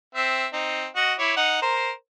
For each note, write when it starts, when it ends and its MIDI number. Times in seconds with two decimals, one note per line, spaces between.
0.15 0.46 60
0.15 0.46 76
0.53 0.87 60
0.53 0.87 63
0.96 1.14 66
0.96 1.14 75
0.96 1.14 78
1.19 1.34 64
1.19 1.34 73
1.19 1.34 86
1.37 1.62 63
1.37 1.62 78
1.62 1.91 70
1.62 1.91 72